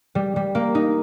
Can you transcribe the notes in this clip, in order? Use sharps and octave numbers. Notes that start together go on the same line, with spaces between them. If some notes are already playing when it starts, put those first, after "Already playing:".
G3
G3
A#3
D#4